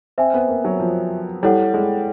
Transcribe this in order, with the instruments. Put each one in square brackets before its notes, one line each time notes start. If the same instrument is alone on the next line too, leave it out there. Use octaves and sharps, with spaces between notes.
[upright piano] C4 [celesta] C5 E5 G#5
[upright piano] B3
A#3
F#3
F3
[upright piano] G3 [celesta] E4 A4 C#5 F#5
[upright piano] G#3